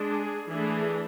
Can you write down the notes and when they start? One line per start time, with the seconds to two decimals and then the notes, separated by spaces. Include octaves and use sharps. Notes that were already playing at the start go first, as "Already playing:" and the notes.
Already playing: G#3 D4
0.11 G#4
0.49 E3 A3 D4 G#4